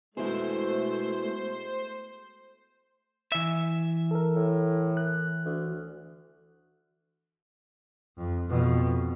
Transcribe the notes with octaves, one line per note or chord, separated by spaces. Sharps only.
B2 G#3 A3 E4 G#4 C5
E3 E5
A4 A#4
A2
F#6
D2
F2
F2 B2